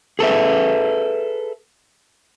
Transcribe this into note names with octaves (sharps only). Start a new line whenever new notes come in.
G#4 A4 B4 E5